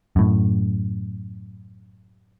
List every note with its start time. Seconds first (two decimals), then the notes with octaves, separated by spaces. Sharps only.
0.16 F#2 A2